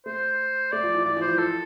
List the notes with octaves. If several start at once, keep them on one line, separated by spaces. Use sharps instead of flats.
A3 C5
A3 D5
F3
E3
F3 D5
E3
C5
F3
A4